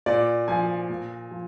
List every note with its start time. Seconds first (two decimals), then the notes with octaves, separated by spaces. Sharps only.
0.06 A#2 D5
0.48 F3 G#5
0.89 A#2
1.31 F3